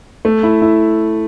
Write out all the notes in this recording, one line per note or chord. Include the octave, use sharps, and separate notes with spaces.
A3
E4
E4